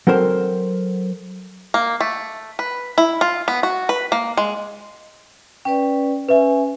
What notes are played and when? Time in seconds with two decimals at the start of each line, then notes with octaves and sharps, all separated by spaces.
0.07 F#3 C4 A4 A#4 C5
1.74 A#3
2.01 A3
2.59 B4
2.98 E4
3.21 F4
3.48 B3
3.63 F#4
3.89 B4
4.12 A#3
4.37 G#3
5.65 C#4 B4 D5 G5
6.28 C#4 B4 E5 G#5